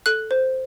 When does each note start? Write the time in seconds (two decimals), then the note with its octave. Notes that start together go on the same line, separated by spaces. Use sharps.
0.06 A4 F#6
0.31 C5